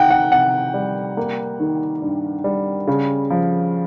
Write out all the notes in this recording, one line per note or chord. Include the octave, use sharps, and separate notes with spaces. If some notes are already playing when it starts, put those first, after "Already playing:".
Already playing: C3 D#3 F#5 G5
F#5
C3 F#5
G3
A#3
D#3
G2
G3
C#3
F3